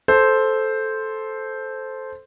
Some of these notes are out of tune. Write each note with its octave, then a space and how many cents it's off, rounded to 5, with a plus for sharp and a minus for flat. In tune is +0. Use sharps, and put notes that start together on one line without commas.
A4 -10 C5 +0